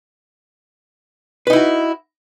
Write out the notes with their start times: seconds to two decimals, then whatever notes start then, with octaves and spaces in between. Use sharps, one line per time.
1.47 B4
1.50 D#4
1.53 E4
1.56 F#4